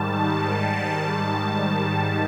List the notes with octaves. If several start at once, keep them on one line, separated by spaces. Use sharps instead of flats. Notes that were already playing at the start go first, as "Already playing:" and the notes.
Already playing: G#2 D#3 G3 A5